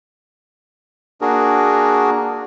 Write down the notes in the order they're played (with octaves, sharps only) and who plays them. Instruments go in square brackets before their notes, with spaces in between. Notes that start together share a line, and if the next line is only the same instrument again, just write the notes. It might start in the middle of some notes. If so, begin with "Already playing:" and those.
[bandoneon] A#3 D4 F#4 G#4 A#4